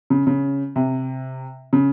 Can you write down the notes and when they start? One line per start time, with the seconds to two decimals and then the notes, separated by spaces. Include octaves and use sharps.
0.10 C#3
0.27 C#3
0.76 C3
1.73 C#3